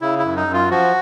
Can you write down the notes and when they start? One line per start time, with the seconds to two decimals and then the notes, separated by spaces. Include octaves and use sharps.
0.01 C#3 E4
0.19 E4
0.24 F#2
0.36 D#4
0.48 F#2
0.53 F4
0.71 F3 F#4